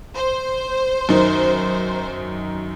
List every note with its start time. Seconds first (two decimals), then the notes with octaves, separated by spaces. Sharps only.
0.16 C5
1.09 F#2 D#3 D#4